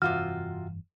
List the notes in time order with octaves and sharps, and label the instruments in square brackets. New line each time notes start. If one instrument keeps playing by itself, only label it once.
[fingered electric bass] F1 G2 E3 [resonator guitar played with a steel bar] C3 F4 F#4 [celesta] F6